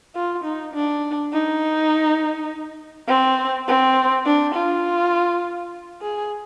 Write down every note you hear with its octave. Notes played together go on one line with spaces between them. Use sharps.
F4
D#4
D4
D#4
C4
C4
D4
F4
G#4